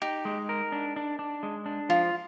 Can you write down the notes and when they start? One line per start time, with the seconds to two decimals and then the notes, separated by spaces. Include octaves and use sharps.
0.02 D#4 G4
0.25 G#3
0.49 A#4
0.72 D4
0.96 D4
1.19 D4
1.43 G#3
1.66 D4
1.89 F3 F4